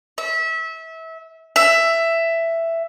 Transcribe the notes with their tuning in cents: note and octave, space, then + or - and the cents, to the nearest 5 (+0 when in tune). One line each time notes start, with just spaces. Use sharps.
E5 -25
E5 +10